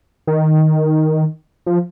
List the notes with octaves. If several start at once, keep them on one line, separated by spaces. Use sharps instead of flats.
D#3
F3